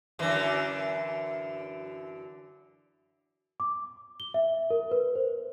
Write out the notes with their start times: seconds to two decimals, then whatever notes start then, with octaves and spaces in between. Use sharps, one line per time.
0.19 F#2 D3 E3
3.60 D6
4.20 G7
4.34 E5
4.71 A#4
4.91 B4
5.15 C5